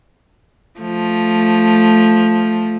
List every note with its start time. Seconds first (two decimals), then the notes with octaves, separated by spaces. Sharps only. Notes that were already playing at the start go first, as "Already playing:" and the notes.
0.80 F3 A3